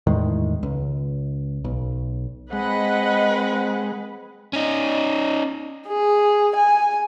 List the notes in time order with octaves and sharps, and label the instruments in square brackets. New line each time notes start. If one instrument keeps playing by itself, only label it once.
[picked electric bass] E2 A2 D#3 G#3
C#2
B1
[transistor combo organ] G#3 [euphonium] C4 [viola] B4 [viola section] D#5 F#5 B5
[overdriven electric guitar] C#4 D#4
[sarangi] G#4
G#5